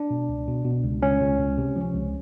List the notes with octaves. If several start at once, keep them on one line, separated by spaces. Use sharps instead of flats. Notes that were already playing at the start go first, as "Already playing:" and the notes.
Already playing: D4
B2
C#2
B2
B2
C#2
C#2 C#4
C#2
C#2
C3
F3
C#2